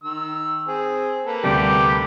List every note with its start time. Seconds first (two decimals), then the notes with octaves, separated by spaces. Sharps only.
0.04 D#3 E6
0.68 C4 G#4
1.26 A#3 A4 B4
1.44 D2 C3 G3 G4